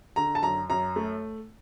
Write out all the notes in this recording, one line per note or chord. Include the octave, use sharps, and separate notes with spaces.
D3 A#5
A5
F#2 A#5
F#2 A#5
A3